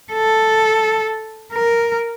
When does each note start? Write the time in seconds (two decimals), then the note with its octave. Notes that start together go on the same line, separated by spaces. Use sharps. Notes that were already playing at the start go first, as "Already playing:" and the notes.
0.12 A4
1.53 A#4